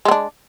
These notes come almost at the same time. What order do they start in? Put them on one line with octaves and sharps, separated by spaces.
G#3 C4 D4